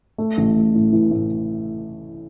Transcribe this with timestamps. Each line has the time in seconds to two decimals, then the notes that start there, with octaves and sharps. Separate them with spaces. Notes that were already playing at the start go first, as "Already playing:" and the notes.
0.18 A3
0.38 A1
0.56 A3
0.75 A2
0.93 E3
1.11 A2